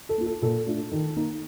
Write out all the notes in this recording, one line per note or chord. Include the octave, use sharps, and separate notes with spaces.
A4
A#3 F4
A4
A#2 A4
A3 D4 F4
D#3
A#3 D#4